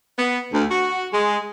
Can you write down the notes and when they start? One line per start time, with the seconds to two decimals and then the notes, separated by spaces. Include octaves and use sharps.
0.18 B3
0.52 D2
0.71 F#4
1.13 G#3